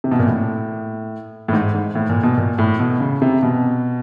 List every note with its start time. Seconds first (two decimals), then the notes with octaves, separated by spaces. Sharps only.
0.04 C3
0.11 B2
0.19 A#2
0.27 A2
1.48 A2
1.53 G#2
1.74 G#2
1.95 A2
2.09 A#2
2.23 B2
2.37 A#2
2.59 A2
2.79 B2
3.00 C#3
3.22 C3
3.43 B2